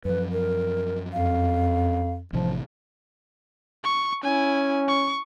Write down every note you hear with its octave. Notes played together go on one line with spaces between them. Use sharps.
F#2 F3 B4
A#4
F2 F5
A1 C3 E3 F3
C#6
C#4 E4 G#5
C#6